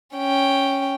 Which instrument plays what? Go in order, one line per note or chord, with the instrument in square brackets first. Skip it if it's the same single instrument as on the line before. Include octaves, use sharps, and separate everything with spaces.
[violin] C#4 G5